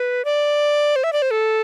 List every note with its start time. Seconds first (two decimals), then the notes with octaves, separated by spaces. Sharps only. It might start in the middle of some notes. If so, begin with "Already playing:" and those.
Already playing: B4
0.25 D5
0.96 C5
1.04 E5
1.13 D5
1.22 C5
1.31 A4